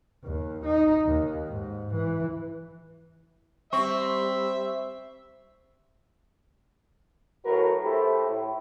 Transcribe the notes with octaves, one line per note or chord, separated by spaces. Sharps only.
D#2
D#4
D#2
G#2
E3
G3 C4 E5 C#6
A2 F#3 F#4 A#4 B4
A3 E4 G4 A4 C5
A2